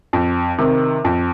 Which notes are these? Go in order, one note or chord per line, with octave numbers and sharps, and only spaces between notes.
F2
C3 D#3
F2